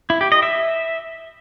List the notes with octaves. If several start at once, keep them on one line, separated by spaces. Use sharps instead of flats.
E4
G4
D#5
E5